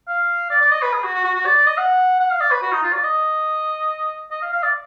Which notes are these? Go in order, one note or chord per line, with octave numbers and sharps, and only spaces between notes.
F5
D5
D5
D#5
B4
G#4
F#4
F#4
F#4
F#4
D5
D5
D#5
F#5
F#5
F5
D5
B4
F#4
D#4
F4
D5
D#5
D#5
F5
F5
D5